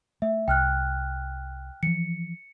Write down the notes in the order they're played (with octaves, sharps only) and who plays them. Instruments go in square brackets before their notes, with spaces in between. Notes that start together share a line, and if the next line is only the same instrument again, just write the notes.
[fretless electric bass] A3 [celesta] E5
[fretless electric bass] C2 [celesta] G5 F6 F#6
[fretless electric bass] E3 F3 [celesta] C#7